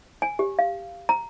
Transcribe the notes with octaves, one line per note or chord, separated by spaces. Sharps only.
G#5
G4
F5
A#5